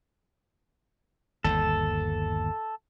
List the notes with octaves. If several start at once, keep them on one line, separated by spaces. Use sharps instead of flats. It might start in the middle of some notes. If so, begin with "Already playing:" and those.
G1 D#2 A4